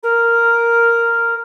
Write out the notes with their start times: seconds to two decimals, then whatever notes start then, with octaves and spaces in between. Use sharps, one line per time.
0.03 A#4